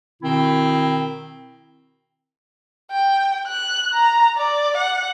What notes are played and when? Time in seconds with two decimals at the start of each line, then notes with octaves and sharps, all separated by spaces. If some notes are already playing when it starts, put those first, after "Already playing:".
0.22 B2 D#3 C4 E4
2.92 G5
3.48 F#6
3.94 A#5
4.38 D5
4.77 F#5